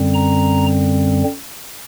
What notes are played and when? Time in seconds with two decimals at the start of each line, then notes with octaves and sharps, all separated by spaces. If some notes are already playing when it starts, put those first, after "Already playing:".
Already playing: F#2 D3 G3 C4
0.14 A#5